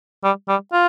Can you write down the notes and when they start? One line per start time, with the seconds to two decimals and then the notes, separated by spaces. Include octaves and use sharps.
0.24 G3
0.48 G3
0.73 F4